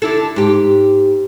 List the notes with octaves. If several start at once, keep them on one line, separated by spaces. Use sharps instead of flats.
D3 E4 A4
G#2 G4